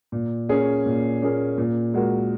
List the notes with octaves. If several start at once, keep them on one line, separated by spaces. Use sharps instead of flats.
A#2
A#3 C#4 G#4
A#2
A#3 C#4 G#4
A#2
G#3 F#4 A#4